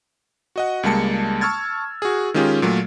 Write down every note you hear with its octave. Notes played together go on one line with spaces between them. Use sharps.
F#4 D#5 F#5
C#2 G3 G#3 A#3 A5 C#7
A5 C#6 E6 F6 G#6 A6
F#4 G#4
D#3 G#3 C#4 F4 G4 G#4
A#2 F#3 A3 A#4